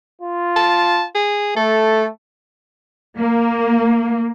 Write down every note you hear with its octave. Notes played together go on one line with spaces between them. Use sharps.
F4
A5
G#4
A3 A4
A#3